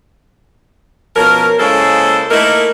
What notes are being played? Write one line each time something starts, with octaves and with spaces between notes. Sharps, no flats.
B2 F3 C#4 A#4
C#3 G#3 A#3 E4 A4 C5
A3 A#3 D#4 E4 A#4